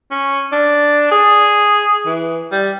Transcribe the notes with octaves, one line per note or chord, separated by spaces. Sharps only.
C#4
D4
G#4
E3
G3